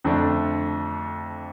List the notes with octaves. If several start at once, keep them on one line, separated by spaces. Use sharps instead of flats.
F2 D3 A3 D4